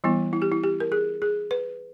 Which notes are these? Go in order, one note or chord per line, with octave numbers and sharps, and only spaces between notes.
E3 G3 B3 E4
E4
G4
E4
G4
A#4
G#4
G#4
B4